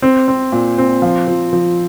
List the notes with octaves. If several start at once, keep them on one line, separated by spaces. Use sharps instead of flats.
C4
C4
A#2
C4
F3
F3
F3